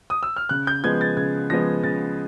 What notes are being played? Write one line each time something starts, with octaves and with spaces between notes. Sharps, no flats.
D#6
E6
F6
C#3 F#6
G6
F3 G#3 B3 G#6
A6
C#3 G#6
F3 G#3 B3 A#6
C#3 A6